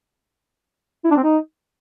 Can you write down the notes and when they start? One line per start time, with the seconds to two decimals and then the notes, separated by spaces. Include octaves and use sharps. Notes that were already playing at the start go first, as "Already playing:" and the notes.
1.05 E4
1.11 D4
1.17 C4
1.23 D#4